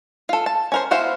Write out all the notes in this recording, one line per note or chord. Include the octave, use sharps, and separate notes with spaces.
F4 A4
A5
C#4 A#4 C5
B3 E4 F#4 C5 F5